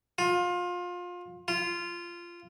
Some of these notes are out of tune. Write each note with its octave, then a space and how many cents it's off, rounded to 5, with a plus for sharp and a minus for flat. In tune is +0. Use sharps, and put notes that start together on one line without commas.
F4 +25
F4 -15